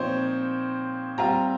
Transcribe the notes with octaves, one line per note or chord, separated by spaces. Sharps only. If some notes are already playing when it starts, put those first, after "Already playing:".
Already playing: A#2 F3 C4 D#4 C5 C#5
G3 C4 F4 A#5